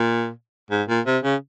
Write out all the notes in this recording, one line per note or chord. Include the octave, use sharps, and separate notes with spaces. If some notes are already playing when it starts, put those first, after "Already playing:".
Already playing: A#2
G#2
A#2
C3
C#3